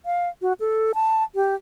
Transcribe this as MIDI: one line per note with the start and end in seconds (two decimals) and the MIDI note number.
0.06 0.29 77
0.42 0.53 66
0.60 0.92 69
0.94 1.23 81
1.35 1.55 67